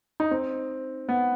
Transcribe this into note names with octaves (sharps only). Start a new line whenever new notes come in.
D#4
C4
B3